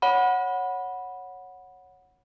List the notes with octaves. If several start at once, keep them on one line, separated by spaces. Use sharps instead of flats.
C#5 F#5 B5